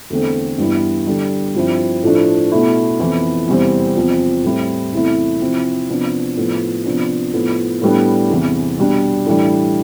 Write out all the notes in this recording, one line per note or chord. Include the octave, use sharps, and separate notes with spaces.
E2 D3 A3 C4
G2 E3 G3 B3 E4
D3 G3 D4
G2 F3 C4 E4
A2 F3 A3 D4
B2 A3 E4
F2 E3 B3 E4
E2 C3 E3 G3 C4
E2 C3 F3 C4
A2 G3 C4 E4
E2 C3 E3 A3 E4
C3 F3 C4 E4
C3 F3 B3 D4
A2 F3 B3
C3 F3 B3 D4
A2 F3 B3
A2 G3 B3 D4
E2 C3 E3
B2 G3 D4
A2 E3 G3 D4